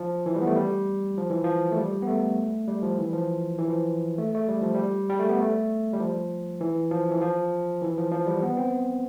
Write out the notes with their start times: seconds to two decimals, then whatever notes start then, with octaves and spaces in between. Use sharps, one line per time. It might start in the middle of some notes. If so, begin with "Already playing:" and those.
Already playing: F3
0.26 E3
0.36 G3
0.42 B3
0.47 A3
0.56 G3
1.17 F3
1.30 E3
1.44 F3
1.71 A3
1.77 G3
2.03 B3
2.08 A3
2.68 G3
2.83 F3
2.99 E3
3.13 F3
3.58 E3
3.68 F3
4.18 A3
4.35 A3
4.48 G3
4.62 F3
4.75 G3
5.09 G3
5.19 A3
5.29 B3
5.40 A3
5.93 G3
6.00 F3
6.61 E3
6.91 F3
7.11 E3
7.22 F3
7.82 E3
7.97 F3
8.12 F3
8.27 G3
8.42 B3
8.57 C4